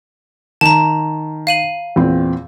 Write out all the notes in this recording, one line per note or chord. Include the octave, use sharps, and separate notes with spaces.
D#3 A5 A#5
F5 D#7 F#7
E2 A#2 C4